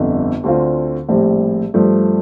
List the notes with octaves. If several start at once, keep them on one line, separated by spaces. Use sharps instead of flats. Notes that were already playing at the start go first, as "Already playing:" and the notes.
Already playing: G1 F2 D3
D2 D3 A3 C4 F4
A#1 A2 G3 C4
G2 F3 A3